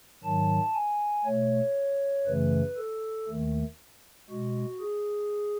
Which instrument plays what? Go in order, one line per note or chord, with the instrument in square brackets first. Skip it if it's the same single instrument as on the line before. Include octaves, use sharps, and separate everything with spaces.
[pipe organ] G#2 D#3 F#3 A5
G#5
B2 A3 C#5
F#2 C#3 E3 A3 B4
A4
D#2 D#3 A3
B2 G#3 F#4
G#4